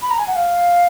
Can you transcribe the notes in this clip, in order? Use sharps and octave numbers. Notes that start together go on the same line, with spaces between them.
B5
A#5
G#5
F#5
F5